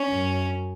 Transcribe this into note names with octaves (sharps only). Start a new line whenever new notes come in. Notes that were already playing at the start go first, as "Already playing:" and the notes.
Already playing: C#4
F#2